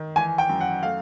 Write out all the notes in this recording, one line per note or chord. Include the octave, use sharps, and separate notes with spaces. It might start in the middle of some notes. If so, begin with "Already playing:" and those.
Already playing: D#3
E3 G#5
G5
F#2
F#5
A3 F5